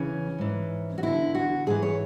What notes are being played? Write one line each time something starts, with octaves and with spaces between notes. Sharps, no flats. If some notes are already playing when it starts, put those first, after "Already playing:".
Already playing: E2 C#3 E3 C#4
G#2 E3
F#4
E2 D3 E4
F#4
G#2 E3 G#4
C#5